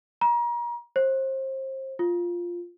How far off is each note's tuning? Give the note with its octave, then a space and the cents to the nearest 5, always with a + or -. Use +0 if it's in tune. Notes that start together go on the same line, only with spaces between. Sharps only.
A#5 +35
C5 +30
F4 +0